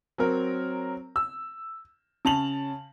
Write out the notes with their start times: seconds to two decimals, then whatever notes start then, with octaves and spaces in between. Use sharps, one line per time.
0.18 F#3 C4 A#4
1.16 E6
2.25 C#3 A5 F7 F#7